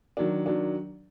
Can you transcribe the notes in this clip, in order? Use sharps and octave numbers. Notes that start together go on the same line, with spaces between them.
D#3 F#3 D4
D#3 F#3 D4